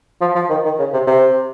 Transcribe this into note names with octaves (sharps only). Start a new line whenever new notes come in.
F3
F3
D#3
D#3
C#3
C3
C3